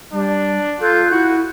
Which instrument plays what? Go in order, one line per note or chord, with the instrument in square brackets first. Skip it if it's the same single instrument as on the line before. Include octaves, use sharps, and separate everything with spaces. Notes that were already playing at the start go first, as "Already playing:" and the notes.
[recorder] G3 [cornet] D4
[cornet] F4 [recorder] A4 [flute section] F#6 G6
[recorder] E4 [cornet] F#4